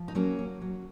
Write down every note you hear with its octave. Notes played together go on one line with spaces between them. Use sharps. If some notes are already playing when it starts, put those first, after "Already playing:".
Already playing: F3
D#4
F#3 A#3 C#4
F#3
F#3